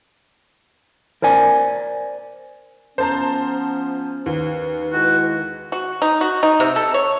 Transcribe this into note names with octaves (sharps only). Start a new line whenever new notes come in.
A#4 C5 D5 G#5
F3 B3 C#4 C5 A5 A#5
D#2 B4
G#3 E4 F#4
F#4
D#4
F#4
D#4
C3
A4
C#5